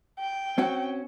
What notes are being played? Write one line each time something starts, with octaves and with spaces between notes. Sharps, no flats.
G5
C4 C#4 F#4